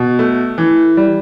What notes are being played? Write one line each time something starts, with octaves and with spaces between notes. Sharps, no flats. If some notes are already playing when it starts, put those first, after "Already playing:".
Already playing: B2
A3
E3
G3